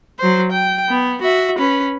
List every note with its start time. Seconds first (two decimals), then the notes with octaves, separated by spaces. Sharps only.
0.19 F#3 C5
0.52 G5
0.89 B3
1.22 F#4 E5
1.59 C#4 B4